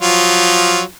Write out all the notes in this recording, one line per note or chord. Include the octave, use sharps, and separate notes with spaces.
F3 F#3 F4